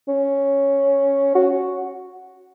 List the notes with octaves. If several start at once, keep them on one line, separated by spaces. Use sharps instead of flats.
C#4
F#4